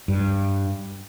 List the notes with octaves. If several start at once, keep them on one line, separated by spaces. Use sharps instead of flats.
G2